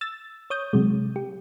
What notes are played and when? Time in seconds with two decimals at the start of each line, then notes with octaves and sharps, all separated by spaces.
0.01 E6 A6
0.50 C#5 D#6 G6
0.73 C3 F#3 G#3
1.16 G4